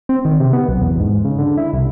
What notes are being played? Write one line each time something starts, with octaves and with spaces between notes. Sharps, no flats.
C4
D#3
C3
B3
B1
E2
G#2
C#3
D3
E4
C2